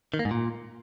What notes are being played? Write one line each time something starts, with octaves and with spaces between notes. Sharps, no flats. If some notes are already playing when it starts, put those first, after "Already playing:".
D#3
A#3
G#2
A#2